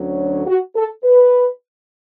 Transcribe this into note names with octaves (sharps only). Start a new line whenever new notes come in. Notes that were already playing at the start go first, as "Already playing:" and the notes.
Already playing: D2 D3 F#3 C#4
F#4
A4
B4